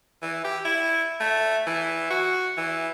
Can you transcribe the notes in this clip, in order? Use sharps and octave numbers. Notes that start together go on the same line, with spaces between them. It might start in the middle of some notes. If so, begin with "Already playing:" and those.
E3
G4
E4
A3
E3
F#4
E3